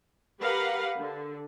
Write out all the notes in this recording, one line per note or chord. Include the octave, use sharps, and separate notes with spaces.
G4 A#4 B4 F5 F#5
D3